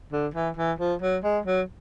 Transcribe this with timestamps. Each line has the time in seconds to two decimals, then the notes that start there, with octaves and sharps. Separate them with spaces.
0.12 D3
0.34 E3
0.57 E3
0.79 F3
1.02 F#3
1.23 G#3
1.46 F#3